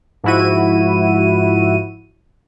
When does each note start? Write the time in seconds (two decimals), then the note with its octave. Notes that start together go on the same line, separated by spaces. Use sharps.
0.24 G#2 F3 E4 F#4 D#7